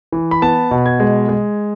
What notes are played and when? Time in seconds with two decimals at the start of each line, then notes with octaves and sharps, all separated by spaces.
0.12 E3
0.31 B5
0.42 B3 A5
0.71 B2
0.86 G#6
1.00 G#3
1.29 G#3